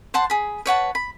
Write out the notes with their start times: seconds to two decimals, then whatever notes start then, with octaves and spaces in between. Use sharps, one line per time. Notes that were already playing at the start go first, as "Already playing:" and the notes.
0.14 C5 F#5 A5 C6
0.30 G#4 B5
0.66 B4 C#5 F#5 A5
0.95 B5